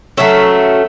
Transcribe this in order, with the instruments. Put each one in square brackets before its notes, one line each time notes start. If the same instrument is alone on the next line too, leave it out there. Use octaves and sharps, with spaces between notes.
[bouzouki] F#3 A3 C#4 E5